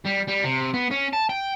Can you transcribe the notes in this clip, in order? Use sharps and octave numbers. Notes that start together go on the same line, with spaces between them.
G3
G3
C3
B3
C#4
A5
G5